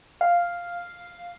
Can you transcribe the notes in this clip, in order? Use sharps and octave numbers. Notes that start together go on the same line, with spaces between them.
F5